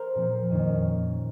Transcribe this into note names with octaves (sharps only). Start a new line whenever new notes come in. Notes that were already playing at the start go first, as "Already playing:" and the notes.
Already playing: A#4 C5
A#2 F3 C4
F2 D#3 A#3 C#4